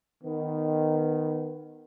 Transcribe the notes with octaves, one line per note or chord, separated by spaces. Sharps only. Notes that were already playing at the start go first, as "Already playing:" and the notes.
D#3 B3